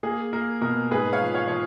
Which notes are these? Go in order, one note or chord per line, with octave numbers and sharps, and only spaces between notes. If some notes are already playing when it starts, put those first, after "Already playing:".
A#3 G#4
A#3 A#4
B2 A#4
G#2 G#4 B4
C#5 F5
F3
C#5 F5
F3 C#5